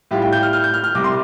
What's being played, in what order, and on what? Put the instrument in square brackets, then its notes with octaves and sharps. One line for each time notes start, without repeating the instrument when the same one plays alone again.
[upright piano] A2 G3 F4 G4
G5
G6
F6
F6
G6
F6
F6
C2 C3 G3 D6
C6